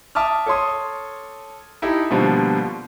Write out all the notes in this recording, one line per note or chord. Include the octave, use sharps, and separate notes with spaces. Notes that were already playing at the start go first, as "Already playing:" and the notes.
E5 A5 D6 D#6 F6
A4 C#5 C6 D#6
D#4 E4 G4 A4
B2 D3 F3 G3 A#3 C4